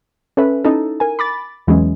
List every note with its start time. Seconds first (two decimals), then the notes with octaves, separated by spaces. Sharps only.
0.37 C#4 A4 B4 E5
0.64 C#4 D#4 E4 A4
1.00 A#4 G#5
1.19 B5 D6 A6
1.67 E2 E3 F#3 G#3 C#4